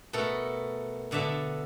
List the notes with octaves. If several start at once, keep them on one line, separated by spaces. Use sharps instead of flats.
B2 A3 A4 A#4
B2 D3 D5 E5 A5